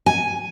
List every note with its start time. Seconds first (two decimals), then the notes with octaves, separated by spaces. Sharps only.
0.06 G#5